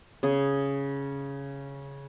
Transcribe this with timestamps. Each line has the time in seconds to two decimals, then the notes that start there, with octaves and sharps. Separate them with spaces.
0.23 C#3 G#4